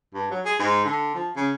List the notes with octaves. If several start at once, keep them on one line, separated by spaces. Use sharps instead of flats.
G2
F#3
G#4
G#2
D3
F3
C#3